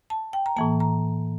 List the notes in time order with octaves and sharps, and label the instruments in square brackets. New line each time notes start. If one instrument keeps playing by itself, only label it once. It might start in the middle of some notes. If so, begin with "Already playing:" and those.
[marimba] A5
G5
A#5
A2 E3 A#3 A5
A#5